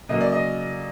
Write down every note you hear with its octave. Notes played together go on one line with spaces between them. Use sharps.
C#3 F#3 A#3 D#5
D5
D#5